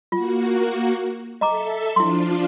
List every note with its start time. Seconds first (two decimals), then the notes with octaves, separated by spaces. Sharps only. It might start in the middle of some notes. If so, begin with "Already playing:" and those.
0.12 A#3 F4 F#4
1.41 A4 D#5 E5 A#5 D6
1.96 F3 D4 E4 F4 C6